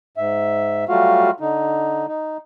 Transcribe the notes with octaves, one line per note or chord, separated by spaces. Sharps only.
G#2 E5
F#3 G3 A3 F4 F#4 F5
D3 D#4
D#4